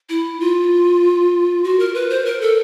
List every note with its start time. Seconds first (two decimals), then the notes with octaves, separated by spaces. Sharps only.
0.09 E4
0.40 F4
1.64 F#4
1.79 A#4
1.94 B4
2.10 C5
2.26 A#4
2.41 A4